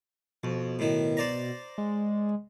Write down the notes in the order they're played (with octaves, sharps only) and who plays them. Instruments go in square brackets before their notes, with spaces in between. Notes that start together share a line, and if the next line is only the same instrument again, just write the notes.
[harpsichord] F2 [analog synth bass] B2
[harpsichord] A2 D#3
C5 D5 A#5
[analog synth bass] G#3